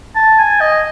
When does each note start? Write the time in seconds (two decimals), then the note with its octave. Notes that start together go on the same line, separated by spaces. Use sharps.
0.15 A5
0.39 G#5
0.61 D#5